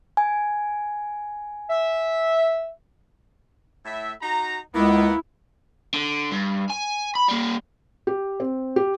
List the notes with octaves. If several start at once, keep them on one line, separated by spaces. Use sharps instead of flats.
G#5
E5
A2 E4 E5
D#4 F#4 A#5
C#2 A#3 B3 E4
D3
G2
G#5
B5
G3 A#3
G4
C4
G4